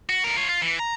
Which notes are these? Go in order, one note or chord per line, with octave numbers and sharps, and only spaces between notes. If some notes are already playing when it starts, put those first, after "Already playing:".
F#4
A2 A#4
F4 C#5
F4
E3
A#5